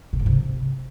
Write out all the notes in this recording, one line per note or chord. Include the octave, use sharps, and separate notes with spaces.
B2
G#2
C3